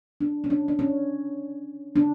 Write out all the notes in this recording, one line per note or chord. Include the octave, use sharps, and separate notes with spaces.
D4
C#4
D4
D4
C#4
D4